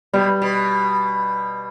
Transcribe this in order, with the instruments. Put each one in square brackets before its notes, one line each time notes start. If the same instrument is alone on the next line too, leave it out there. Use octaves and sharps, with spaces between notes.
[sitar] B2 [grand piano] G3
[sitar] B2